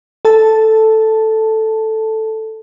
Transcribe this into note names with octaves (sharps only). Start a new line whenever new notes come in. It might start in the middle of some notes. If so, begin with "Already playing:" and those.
A4 A5